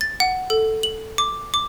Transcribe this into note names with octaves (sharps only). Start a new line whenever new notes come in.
A6
F#5
A4
F#7
D6
D6